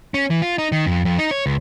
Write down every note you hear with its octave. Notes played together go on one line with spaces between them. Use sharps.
C#4
E3
F4
D#4
D#3
F2
F2
D#4
C#5
C#2